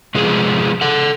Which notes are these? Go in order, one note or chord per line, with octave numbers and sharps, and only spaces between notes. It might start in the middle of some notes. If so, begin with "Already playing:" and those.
C3 F3 G#3 B3 G#4
A4 F#5